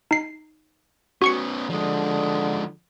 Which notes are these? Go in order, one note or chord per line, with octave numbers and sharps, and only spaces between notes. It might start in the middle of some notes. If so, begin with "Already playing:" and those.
D#4 C7
B3 C#4 F#4 C#6 C#7
D3 F3 G#3